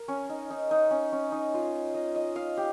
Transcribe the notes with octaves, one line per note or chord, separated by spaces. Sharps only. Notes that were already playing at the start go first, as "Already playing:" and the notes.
Already playing: A#4
C#4
D#4
D#4
D#4
C#4
C#4
D#4
F4
D#5
D#5
F5
G4